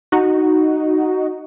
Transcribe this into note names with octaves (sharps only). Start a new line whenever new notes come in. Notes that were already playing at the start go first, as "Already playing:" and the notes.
D#4 F#4